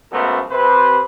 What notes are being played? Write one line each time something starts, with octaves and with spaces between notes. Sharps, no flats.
C#2 F#2 A3 B3 A#4 C5
C3 B4 C5